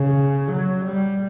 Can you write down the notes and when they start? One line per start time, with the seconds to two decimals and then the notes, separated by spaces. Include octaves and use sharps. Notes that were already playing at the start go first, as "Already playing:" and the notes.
Already playing: C#3
0.52 F#3
0.85 G3